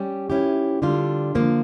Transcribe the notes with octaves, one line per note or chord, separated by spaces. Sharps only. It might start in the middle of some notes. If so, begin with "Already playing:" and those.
Already playing: G3 C#4 G4
F3 C#4 E4 G4
D3 G3 D4 F4
D3 F3 A#3